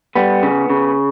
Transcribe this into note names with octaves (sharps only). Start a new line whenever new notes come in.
G3 B3
C#3
C#3